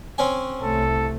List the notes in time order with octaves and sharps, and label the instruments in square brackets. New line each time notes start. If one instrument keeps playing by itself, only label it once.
[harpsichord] C4 C#4 G#5
[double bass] C2 A3 [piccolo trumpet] A4